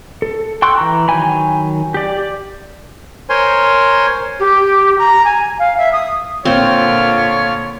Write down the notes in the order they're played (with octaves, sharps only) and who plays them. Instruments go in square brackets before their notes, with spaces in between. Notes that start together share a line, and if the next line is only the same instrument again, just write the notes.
[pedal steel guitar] A4
G5 C6 C#6 E6 F#6
E3 A#5
D#3 F#3 G5 G#5 B5
G4 D5
[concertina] A#4 C5 C#5 G#5 C6
[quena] G4
A#5
G#5
F5
E5
D#6
[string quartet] A#2 D3 [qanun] C4 [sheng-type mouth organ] F4 F6 [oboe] C#5